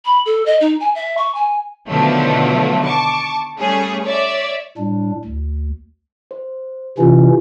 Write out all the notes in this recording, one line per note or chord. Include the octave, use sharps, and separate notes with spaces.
B5
A4
D#5
D#4
G#5
E5
C#6
G#5
B2 D3 D#3 F3 F#3 A3
A5 C#6 D6
G3 A3 C#4 G#4
C#5 D5 E5
A2 G3 D4
D2
C5
C3 E3 C#4 E4 F4 G4